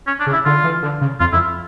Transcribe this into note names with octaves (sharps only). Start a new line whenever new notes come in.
C#4
D4
C#3
E4
D3 F4
E3
D3
C#3
F2 F4
F2 E4